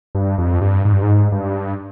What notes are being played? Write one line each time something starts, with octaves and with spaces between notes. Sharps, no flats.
G2
F2
G2
G#2
G2
G#2
G2